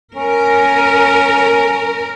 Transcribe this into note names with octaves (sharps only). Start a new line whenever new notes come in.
C#4 A#4